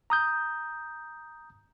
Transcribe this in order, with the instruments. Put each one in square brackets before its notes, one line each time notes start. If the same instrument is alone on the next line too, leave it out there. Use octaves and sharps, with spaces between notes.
[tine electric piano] A#5 D#6 G6